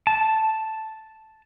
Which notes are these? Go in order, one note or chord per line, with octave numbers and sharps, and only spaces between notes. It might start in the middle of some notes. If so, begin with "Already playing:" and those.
A5